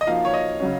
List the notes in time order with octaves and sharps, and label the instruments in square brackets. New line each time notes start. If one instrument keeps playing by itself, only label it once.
[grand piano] D#5
[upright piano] F3 A#3 D#4 F#4 [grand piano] F5
[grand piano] C#5
D#5
[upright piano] C#3 F#3 C#4